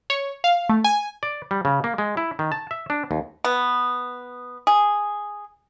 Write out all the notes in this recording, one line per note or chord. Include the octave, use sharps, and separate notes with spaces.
C#5
F5
A3
G#5
D5
G3
C#3
A#3
G#3
E4
D#3
A5
E5
D4
D#2
B3
G#4